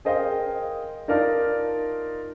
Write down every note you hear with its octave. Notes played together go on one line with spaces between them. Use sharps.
G#4 A#4 C5 D#5 F5 G5
D#4 F4 A#4 D5 A5